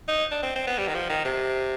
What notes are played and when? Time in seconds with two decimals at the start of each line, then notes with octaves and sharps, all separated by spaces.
0.08 D#4
0.31 D4
0.43 C4
0.56 C4
0.67 B3
0.78 G3
0.88 D#3
0.94 F3
1.09 D#3
1.25 C3